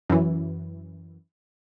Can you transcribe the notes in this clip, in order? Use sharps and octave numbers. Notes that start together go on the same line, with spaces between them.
F#2 E3